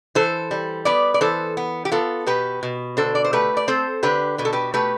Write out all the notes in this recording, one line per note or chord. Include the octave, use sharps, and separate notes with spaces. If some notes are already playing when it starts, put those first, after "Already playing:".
E3 A4 C5
G3
B3 B4 D5
D5
E3 A4 C5
B3
G4
B3 F4 A4
B2 G4 B4
B2
D3 A4 C5
D5
C5
A3 G4 B4
D5
C4 A4 C5
D3 G4 B4
B2 B4
A4
G4 B4
A3 G4 B4